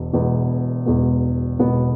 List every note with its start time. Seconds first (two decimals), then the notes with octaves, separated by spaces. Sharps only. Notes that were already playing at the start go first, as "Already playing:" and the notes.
Already playing: E1 E2 B2
0.13 E1 E2 B2 B3
0.86 E1 E2 B2 B3
1.59 E1 E2 B2 B3